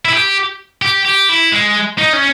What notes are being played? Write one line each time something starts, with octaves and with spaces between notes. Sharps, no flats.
E4
G4
G4
G4
E4
G#3
D#4
C#4